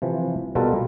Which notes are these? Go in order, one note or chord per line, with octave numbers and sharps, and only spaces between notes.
C3 E3 F3
B2 G3 F4 A4 A#4